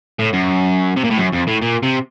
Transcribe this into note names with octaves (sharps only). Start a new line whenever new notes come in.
A2
F#2
C3
A#2
A2
F#2
F2
A2
A#2
C3